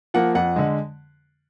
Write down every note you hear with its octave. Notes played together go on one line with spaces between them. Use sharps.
F3 A#3 F#5
F2 F#5
D3 G#3